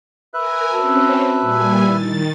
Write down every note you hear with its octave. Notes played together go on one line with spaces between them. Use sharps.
A#4 B4 E5 G#5 F#6
C4 C#4 F#4 A5 E6
A#2 G3 G#5
D#3 G3 E4 A6